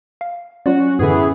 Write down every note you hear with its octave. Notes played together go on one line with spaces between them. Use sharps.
F5
F#3 C#4 F4 F#4 D5
F#2 A2 D3 E3 B3 G#4